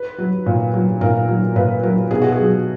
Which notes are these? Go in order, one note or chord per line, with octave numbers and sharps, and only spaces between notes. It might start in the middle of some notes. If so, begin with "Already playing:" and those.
Already playing: B4
F#3
A#2
F#3
A#2 A#4
F#3
A#2 B4
F#3 A#4
B2 G#4
F#4
G#4
F#3